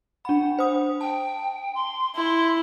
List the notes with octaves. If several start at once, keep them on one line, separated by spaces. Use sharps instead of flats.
D4 F#5 B5
C5 D#6
G5 A5
C6
E4 C6